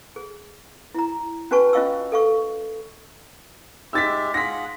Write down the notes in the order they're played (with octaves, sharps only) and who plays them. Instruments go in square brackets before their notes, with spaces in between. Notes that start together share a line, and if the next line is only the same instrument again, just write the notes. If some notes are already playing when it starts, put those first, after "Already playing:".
[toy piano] G#4
E4 A#5
C#4 F#4 B4 G#5 A5 C#6
C#4 F4 D#5 F5 C#6 E6
A4 F5 C#6
[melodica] G#3 G4 E5 [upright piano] E6 A6 B6
[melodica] F4 G#4 F#5 [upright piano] A#6 B6